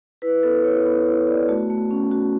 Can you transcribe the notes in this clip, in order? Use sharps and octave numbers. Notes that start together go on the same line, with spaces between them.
E4 B4
B3 A4
E4 C#5
B3
E4 C#5
B3 D5
A3 F#4
A3
C#4
F#4